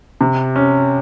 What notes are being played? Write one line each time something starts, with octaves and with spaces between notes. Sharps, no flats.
C3
C#4